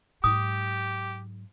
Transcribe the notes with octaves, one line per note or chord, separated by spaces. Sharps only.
G#2 F#3 G4 D#6